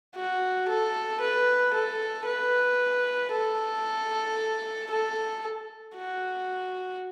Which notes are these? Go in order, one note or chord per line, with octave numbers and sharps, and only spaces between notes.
F#4
A4
B4
A4
B4
A4
A4
F#4